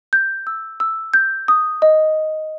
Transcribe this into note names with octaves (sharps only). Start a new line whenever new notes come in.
G6
E6
E6
G6
D#6
D#5